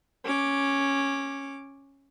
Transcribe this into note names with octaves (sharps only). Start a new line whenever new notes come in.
C#4 D6